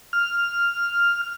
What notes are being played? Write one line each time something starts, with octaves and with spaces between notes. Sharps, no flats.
F6